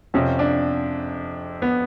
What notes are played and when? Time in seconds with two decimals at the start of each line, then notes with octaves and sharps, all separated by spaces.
0.14 F2 C3 F3 C#4
0.39 D4
1.62 B3